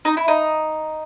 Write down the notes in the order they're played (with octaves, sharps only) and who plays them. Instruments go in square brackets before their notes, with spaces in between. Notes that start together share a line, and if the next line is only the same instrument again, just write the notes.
[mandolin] D#4
E4
D#4